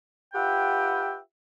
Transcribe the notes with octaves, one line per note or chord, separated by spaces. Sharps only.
F4 G4 B4 E5 F#5 G5